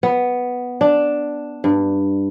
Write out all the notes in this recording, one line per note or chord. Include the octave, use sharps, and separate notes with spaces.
B3
D4
G2